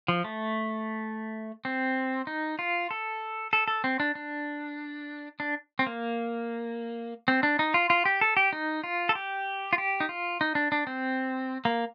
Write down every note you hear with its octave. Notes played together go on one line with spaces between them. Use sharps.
F3
A3
C4
D#4
F4
A4
A4
A4
C4
D4
D4
D4
C4
A#3
C4
D4
D#4
F4
F4
G4
A4
G4
D#4
F4
A4
G4
F4
G4
D#4
F4
D#4
D4
D4
C4
A#3